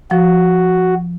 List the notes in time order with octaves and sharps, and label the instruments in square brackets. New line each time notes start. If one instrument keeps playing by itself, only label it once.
[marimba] F3 [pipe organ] F#4